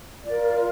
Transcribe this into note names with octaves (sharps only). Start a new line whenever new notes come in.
F4 A#4 D5